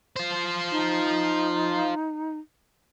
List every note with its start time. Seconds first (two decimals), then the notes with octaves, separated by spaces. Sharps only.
0.16 F4 C5
0.71 D#4